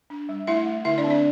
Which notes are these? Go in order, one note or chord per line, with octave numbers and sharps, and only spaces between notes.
D4
G3
A3 E4 E5
A3
D3 E4 E5
D4 D5
C4
D4 D5